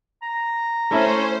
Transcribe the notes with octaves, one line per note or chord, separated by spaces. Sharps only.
A#5
A3 C#4 E4 C5